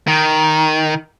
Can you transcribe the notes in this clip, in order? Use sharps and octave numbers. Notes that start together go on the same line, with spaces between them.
D#3